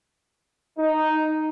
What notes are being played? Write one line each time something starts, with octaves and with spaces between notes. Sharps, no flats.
D#4